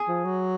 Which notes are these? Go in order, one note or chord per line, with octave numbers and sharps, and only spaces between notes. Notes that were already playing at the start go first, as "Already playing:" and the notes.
Already playing: G#4
F3
F#3